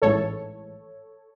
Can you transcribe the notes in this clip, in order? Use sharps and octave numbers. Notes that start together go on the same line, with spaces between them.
A1 G#2 E3 A4 C#5